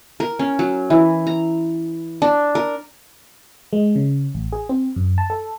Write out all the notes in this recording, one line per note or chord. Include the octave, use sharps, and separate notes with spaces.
A#4
C#4
F#3
E3
A#5
D4
A#4
G#3
C#3
A1
G#4
C4
F#2
A5
A4